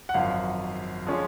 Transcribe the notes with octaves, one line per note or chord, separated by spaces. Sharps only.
F#5
G#1 F#2 F3 F5
F3 G#3 C#4